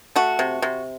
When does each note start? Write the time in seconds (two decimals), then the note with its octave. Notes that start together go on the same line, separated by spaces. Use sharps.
0.16 A3 F#4
0.39 C3
0.62 C3